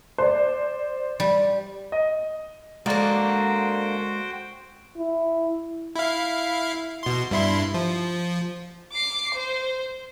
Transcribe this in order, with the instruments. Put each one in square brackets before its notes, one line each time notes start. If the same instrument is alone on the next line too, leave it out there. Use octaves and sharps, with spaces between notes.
[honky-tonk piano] C5 D5
[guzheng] G3
[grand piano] D#5
[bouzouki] D3 A#3 [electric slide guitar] G#3 D5 [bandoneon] F#4 C5 G5
[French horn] E4
[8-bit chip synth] E4 F5
B2 C6
G2 E4 C6
F3
[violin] D6 C7
C5